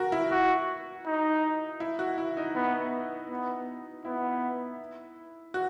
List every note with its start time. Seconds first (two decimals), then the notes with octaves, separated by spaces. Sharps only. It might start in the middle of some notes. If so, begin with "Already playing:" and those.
Already playing: F#4 A#4
0.12 E4
0.31 F#4
1.06 D#4
1.80 E4
1.99 F#4
2.18 E4
2.37 D#4
2.55 B3
3.29 B3
4.05 B3 E4
5.54 F#4